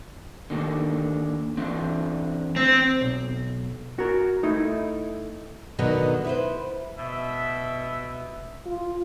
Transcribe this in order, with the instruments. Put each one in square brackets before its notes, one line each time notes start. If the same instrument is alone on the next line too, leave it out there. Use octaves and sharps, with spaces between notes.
[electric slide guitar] D3 D#3 A#3
D3 E3 C4
[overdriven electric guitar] C4
[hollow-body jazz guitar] B1
F#4 A#4
A3 D#4 E4
[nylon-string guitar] B2 D3 D#3 F#3 B3
E4 B4 C5
[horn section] B2 E5
[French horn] F4